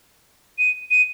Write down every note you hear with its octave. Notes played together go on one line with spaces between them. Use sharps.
D#7
D#7